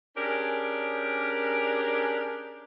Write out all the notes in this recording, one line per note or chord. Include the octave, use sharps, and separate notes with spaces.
C#4 D4 G4 G#4 A#4